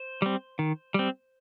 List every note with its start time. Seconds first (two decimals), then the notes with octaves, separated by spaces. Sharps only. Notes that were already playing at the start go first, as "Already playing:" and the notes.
Already playing: C5
0.22 G3 C4
0.59 D#3
0.94 G3 C4